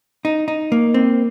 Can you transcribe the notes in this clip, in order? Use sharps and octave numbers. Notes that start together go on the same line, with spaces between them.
D#4
D#4
A#3
C4